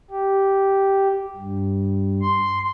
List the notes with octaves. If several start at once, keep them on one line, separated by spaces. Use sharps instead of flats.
G4
G2
C6